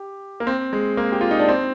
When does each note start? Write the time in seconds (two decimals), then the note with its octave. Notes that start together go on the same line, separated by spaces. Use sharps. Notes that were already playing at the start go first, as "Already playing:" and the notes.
Already playing: G4
0.40 A#3
0.47 C4
0.73 G#3
0.97 A#3
1.12 G4
1.21 F4
1.31 D#4
1.39 D4
1.48 C4